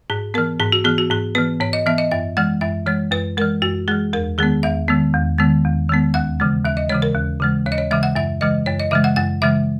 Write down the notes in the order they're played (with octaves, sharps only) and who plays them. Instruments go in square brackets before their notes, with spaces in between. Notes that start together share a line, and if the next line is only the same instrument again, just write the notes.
[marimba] G#2 G#4
E3 B3 A#4
G#2 G#4
F#4
E3 B3 G#4
F#4
G#2 G#4
E3 B3 B4
G#2 C#5
D#5
E3 B3 E5
D#5
F#2 E5
E3 G#3 F#5
F#2 E5
E3 G#3 C#5
F#2 B4
E3 G#3 A#4
F#2 F#4
E3 G#3 G#4
E2 A#4
D#3 G#3 B3 G#4
E2 E5
D#3 G#3 B3
E2
D#3 G#3 B3
E2
D#3 G#3 B3
D#2 F#5
C#3 E3 G#3
D#2 E5
D#5
C#3 E3 G#3 C#5
A#4
D#2
C#3 E3 G#3
D#2 C#5
D#5
C#5
C#3 E3 G#3 E5
F#5
F#2 E5
C#3 E3 G#3 D#5
F#2 C#5
D#5
C#3 E3 G#3 E5
F#5
F#2 F#5
C#3 E3 G#3 E5